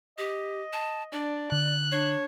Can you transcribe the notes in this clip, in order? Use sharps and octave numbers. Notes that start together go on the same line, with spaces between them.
G4 D#5
A5
D4 D5
D3 F#6
D4 C#5